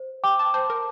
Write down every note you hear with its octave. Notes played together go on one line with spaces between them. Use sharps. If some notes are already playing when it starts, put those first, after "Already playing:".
Already playing: C5
G5 D6
A5
C5 A5
A#4